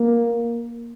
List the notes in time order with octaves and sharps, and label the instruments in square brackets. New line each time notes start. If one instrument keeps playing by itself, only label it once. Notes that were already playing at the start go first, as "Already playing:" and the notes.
Already playing: [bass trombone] A#3